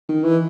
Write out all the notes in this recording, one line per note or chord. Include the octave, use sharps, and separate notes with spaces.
D#3
E3